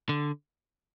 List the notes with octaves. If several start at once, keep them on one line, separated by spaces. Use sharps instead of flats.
D3